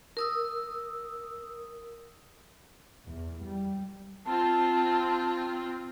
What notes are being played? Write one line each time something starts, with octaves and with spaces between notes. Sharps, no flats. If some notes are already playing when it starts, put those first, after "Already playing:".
A#4 D#6 E6
E2
G3
C4 F4 A5